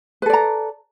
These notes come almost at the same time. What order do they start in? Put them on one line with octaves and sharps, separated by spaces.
B4 A4 D5 A#5